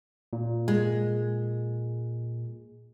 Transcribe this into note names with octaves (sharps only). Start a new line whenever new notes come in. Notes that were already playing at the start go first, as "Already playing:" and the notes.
A#2
G#3